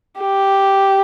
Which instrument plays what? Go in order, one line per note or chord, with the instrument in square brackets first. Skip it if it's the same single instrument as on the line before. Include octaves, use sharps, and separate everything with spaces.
[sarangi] G4